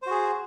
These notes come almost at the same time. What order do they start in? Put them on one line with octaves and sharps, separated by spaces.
C5 F#4 G#4